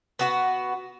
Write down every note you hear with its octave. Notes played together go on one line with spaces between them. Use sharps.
B3 F#4 B4